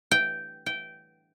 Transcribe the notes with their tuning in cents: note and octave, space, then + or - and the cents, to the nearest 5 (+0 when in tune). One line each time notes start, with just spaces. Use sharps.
G5 -10
G5 -15